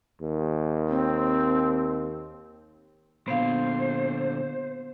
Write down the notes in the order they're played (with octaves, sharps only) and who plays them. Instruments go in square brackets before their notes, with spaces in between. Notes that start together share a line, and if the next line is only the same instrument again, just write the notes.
[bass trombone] D#2
[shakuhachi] C4
[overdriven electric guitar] A#2 D3 [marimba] B3 F5 [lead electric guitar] C5